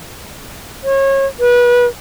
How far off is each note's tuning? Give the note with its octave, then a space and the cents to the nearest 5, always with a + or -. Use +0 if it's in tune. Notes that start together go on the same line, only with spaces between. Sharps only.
C#5 -30
B4 -25